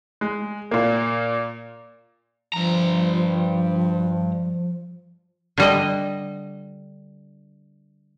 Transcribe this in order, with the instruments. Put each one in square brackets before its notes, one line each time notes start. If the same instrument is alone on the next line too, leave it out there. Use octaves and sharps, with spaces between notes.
[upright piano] G#3
A#2 A#3
[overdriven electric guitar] G2 A#5 [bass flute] F3
[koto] D3 G3 D#5